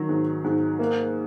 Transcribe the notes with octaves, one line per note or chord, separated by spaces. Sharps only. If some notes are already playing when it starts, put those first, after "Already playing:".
Already playing: D#3 F#3
G#2
G#2
A#3